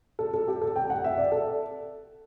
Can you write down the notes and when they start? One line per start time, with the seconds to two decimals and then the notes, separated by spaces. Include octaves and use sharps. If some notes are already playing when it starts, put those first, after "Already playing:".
0.19 A4
0.34 A4
0.48 G4
0.61 A4
0.76 G5
0.90 F#5
1.04 E5
1.18 D5
1.32 A4